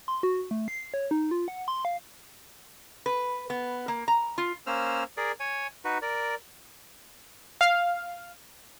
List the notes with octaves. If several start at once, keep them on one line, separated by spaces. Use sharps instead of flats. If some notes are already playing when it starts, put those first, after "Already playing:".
C6
F#4
A3
C7
C#5
D#4
F4
F#5
C6
F5
B4
B3
A#3
A#5
F4
A#3 C#4 C5 E6 F6
G#4 A#4 D5
C#5 G#5
D#4 F#4 B4
A#4 D5
F5